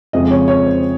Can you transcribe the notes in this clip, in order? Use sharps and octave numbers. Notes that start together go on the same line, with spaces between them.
F2 C#3 F3 G#3 D#5
C#5
C#5
C5